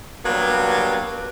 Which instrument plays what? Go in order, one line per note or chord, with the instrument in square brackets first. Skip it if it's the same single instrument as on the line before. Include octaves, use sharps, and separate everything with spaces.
[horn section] F#3 G3 A#3 B3 D4